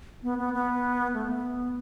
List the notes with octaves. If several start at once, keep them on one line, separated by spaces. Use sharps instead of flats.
B3
B3
B3
A3
B3